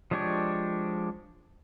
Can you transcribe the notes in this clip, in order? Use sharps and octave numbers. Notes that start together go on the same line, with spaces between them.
F3 G#3 D4 G4 C#5